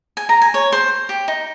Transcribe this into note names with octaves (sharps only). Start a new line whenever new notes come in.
G#5
A#5
G#5
C#5
C5
G4
D#4